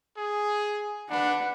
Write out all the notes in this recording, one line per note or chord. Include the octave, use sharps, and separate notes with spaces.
G#4
D4 B4 F#5